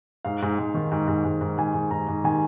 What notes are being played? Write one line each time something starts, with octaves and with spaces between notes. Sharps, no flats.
G#2 F5
G#2
G#2
D#3
G#2
G#2
G#2
G#2
G#2 G#5
G#2
G#2 A#5
G#2
D#3 G#5